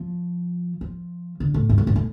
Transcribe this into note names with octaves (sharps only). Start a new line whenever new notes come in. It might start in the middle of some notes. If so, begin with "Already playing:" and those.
Already playing: F3
F3
D3
A2
G2
A2
G2
A2